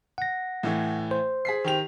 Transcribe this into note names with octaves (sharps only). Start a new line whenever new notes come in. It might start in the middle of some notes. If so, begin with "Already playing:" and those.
F#5 A#6
A2 E3 A3
C5
G#4 B6 C7
D#3 G4 F7